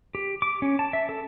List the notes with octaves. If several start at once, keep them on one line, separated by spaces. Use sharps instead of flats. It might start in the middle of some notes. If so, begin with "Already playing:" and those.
G4
D6
C#4
A5
E5
A4